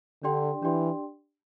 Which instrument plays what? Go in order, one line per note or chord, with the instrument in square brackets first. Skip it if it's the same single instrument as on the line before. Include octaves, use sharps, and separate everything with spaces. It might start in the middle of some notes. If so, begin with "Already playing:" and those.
[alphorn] D3 [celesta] D4 G4 D5 G5 C6
[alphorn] E3 [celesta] D4 G4 D5 G5 C6